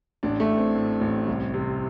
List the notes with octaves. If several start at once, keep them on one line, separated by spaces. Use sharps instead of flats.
A1 D4
A3
A2
C4
A2
A1
C2
C3